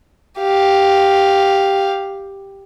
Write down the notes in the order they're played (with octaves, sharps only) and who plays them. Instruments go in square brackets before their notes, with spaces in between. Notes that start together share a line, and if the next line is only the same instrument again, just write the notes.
[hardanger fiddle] G4 F5